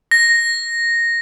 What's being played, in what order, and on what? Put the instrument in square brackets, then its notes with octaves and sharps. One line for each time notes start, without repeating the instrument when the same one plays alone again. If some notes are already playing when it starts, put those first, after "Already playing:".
[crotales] A#6